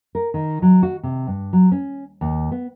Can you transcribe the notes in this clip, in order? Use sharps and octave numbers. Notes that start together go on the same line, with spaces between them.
A#4
D#3
F#3
F#4
C3
G2
F#3
C#4
D#2
B3